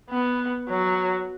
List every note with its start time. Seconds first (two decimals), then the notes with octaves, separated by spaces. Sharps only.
0.10 B3
0.69 F#3